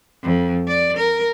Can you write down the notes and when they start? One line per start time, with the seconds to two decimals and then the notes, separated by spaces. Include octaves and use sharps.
0.23 F2
0.68 D5
0.97 A#4